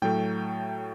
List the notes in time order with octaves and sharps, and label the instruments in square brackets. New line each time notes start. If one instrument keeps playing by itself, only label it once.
[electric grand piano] A2 F#3 A3 G5